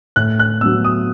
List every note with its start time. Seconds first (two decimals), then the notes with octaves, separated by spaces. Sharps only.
0.16 A2 F#6
0.39 F#6
0.61 F#3 B3 E6
0.84 D#6